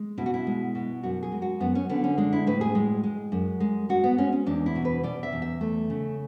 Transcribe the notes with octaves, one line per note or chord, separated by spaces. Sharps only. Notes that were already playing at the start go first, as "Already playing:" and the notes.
Already playing: G#3
B2 E4
F#4
E4
G#3
B2
F#2 F#4
G#4
G#3
F#4
F#2 B3
C#4
D3 B3
C#4
G#3 D4
E4
A2 B4
G#4
G#3
G#3
F#2
G#3
G#3 F#4
B3
G#3 C#4
C#4
E2 D4
E4
B2
B4
B2 D5
E5
E2
E5
A3
C#3